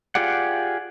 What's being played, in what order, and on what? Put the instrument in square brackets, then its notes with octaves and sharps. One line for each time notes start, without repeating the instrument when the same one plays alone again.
[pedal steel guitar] F4 G4 G#4 D5 F#5